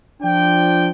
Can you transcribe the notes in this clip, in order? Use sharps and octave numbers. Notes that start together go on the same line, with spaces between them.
F3 D4 G5